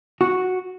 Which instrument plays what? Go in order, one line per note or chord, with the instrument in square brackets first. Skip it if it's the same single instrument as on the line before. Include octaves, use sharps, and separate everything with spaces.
[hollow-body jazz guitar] F#4